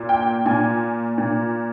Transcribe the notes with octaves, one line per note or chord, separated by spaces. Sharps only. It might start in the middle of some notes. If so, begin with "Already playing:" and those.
Already playing: A#2
G5
A#2 G#5
A#2